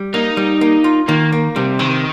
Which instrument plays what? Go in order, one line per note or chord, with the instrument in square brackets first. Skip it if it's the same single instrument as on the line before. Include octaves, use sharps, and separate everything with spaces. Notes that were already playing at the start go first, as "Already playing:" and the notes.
Already playing: [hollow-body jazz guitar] G3
[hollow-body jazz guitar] A#3 [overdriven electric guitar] D#4
[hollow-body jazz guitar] G3
A#3
F4
[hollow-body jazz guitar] D#3 [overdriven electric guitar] A#3
[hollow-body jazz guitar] A#3
[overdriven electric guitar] C3 [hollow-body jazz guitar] G3
[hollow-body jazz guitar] C3 [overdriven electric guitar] D#3